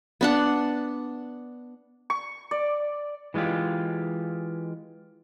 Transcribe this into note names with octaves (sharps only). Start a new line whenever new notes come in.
B3 D4 F#5
C#6
D5
E3 G#3 A3 F4 G4